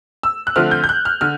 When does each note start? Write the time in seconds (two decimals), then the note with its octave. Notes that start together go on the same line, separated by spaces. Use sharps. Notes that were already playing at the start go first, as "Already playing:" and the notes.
0.23 E6
0.47 F#6
0.56 D3 F3 A3 C4 F6
0.71 G6
0.84 G6
0.89 F#6
1.05 F6
1.21 D3 F6